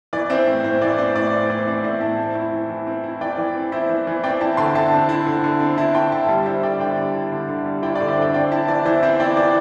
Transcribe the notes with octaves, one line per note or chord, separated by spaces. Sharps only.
E3 D5
C4 C5 E5
A2
A2 C5
E3 D5
C4 C5
A2 D5
A2 C5
E3 C5
C4 D5
A2 C5 E5
A2 E5 A5
C4
E4
E3
E3
C4
E4
E3 D5 G5
E3
C4
E4 C5 E5
E3
E3
C4 D5 G5
E4 E5 A5
D3 G5 C6
D3 E5 A5
C4
E4
D3
D3
C4
E4 E5 A5
D3 G5 C6
D3 E5 A5
G3
E4 C5 E5
D3 D5 G5
D3 D5 G5
G3
E4
D3
D3
G3
E4 D5 G5
D5 G5
D3
C5 E5
D3 D5 G5
C4 D5 G5
E4 E5 A5
E3 D5
E3 C5 E5
C4 C5 E5
E4 D5 G5
E3 D5